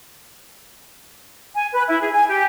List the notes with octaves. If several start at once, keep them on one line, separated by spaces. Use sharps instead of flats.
G#5
B4
E4
G#4
G#5
G4